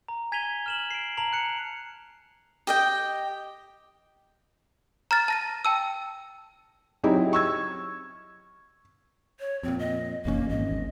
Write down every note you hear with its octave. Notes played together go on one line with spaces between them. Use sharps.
A#5
G#5 G#6 B6 D#7 F7 G7
F6 E7 F#7
C7 D7
A5 A#5 C7 F7 F#7
F#6 C#7
G4 D#5 G5
A#5 F6 A6
A5 A#6 D#7
G5 A5 E6
F#3 C4 D#4 E4 G4 G#4
C#6 E6 G#6
C#5
F2 A#2 C4
D#5
F1 A#1 E2 A#3 C#4
G#1 D#5